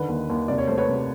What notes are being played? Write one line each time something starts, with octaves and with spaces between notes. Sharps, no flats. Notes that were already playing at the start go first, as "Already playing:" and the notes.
Already playing: D3 D#3 B4
D#2
D#2
C3 D5
C#5
A3 C5
B4 C#5
C3